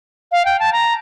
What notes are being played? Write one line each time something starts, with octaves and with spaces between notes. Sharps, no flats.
F5
G5
A5
A#5